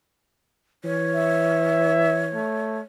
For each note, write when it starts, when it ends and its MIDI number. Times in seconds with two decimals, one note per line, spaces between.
0.84 2.39 52
0.84 2.79 73
1.15 2.28 76
2.34 2.81 57